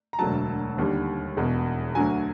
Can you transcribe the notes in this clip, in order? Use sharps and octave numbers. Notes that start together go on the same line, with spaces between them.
A#5
E1 D2 D3 F#3 A5
D#2 D3 G3
E1 E2 B2
D2 D3 F#3 G#5